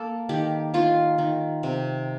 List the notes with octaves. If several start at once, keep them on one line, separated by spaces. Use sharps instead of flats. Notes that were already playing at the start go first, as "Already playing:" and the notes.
Already playing: A#3 A4
D#3 G4
D#3 F4
D#3
C3